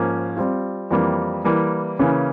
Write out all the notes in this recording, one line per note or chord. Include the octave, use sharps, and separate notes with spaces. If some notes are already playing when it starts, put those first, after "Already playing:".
Already playing: G#2 F3 A#3 C#4
G3 C4 F4
F2 E3 G3 A#3
E3 G3 A#3
C#3 E3 A#3 C#4